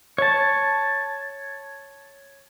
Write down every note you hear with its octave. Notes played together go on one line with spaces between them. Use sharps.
C#5 A5